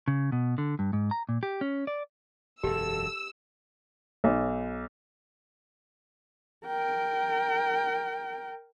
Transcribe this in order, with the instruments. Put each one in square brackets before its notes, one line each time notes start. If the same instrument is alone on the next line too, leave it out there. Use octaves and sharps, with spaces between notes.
[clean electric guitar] C#3
B2
D3
G2
G#2
A#5
A#2
G4
C#4
D5
[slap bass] E1 F#2 [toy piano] G4 [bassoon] A4 [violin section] E6
[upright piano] B1
[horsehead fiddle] A#4 G5